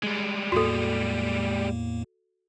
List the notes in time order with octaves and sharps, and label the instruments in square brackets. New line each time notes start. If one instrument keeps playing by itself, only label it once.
[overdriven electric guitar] G3 G#3
[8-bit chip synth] E2 A2 A#3 [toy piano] F#4 A4